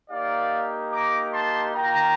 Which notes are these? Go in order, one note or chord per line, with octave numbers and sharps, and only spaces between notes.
A#3 D#4 G4 D5 F5
A#5 D6
A5 C6
A#3 F4 G5 A#5